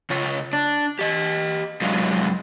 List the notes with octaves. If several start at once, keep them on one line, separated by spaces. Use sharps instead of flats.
C#3 F4 C#5
D4
G4 D#5
F#2 C3 F#3 G#3 D#4 F4